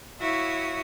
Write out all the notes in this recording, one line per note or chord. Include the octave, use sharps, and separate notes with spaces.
E4 F#4 C#5 E5 F5 D#6